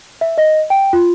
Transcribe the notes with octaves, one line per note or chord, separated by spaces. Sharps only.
E5
D#5
G5
F4